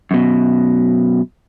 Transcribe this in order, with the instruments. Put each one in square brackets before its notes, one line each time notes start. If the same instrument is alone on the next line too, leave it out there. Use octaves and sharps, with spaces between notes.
[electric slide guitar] F#2 B2